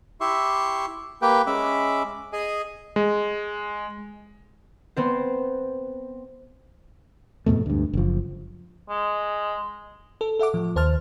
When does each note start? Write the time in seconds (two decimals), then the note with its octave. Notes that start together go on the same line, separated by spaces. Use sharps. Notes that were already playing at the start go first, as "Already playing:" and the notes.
0.21 E4 G4 E5 C6 C#6
1.22 A#3 G4 B4 G5
1.47 G#3 C#4 E5 B5 D6
2.33 G#4 D#5 G#5
2.96 G#3
4.97 B3 C4 C5
7.46 F2 G#2 B2 A3
7.66 D2 G2
7.93 F#1 F3
8.89 G#3
10.21 A4
10.39 A4 E5 F#5 D6
10.54 A2 F3
10.76 D#2 C5 A5 F6